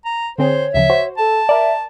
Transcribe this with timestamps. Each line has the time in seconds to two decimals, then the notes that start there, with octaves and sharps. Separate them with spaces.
0.05 A#5
0.38 D3 C4 G#4 C5 C#5
0.74 D2 C#3 F3 E5
0.90 F#4 C5
1.18 A4 A5
1.49 A#4 D5 E5